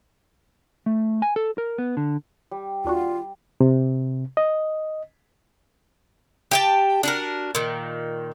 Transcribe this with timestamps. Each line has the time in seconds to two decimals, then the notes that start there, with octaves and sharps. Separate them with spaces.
0.86 A3
1.22 G#5
1.36 A4
1.58 A#4
1.78 B3
1.97 D3
2.51 G3
2.85 D#2 D4 F4 F#4
3.61 C3
4.37 D#5
6.51 G4 G5 A5
7.03 D4 F#4 A#4
7.55 A#2 D#3